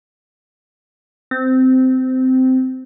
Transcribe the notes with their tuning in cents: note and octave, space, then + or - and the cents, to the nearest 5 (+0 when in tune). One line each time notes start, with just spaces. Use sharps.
C4 -15